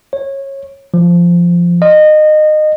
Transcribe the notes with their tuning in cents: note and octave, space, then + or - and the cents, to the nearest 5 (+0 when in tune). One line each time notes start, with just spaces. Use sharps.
C#5 -20
F3 -10
D#5 -25